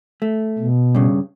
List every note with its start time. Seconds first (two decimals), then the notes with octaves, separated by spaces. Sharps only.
0.22 A3
0.59 B2
0.95 G2 C#3